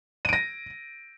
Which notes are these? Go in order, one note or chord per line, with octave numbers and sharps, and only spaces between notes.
A#6 D7 D#7